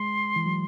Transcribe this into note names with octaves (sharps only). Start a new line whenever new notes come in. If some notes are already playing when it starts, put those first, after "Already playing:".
Already playing: G#3 C6
E3
F#3